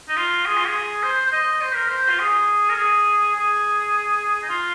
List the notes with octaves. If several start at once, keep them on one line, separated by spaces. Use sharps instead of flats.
D#4
F4
G#4
F4
G#4
C5
C5
D#5
C5
A#4
C5
F4
G#4
A#4
G#4
G#4
D#4
F4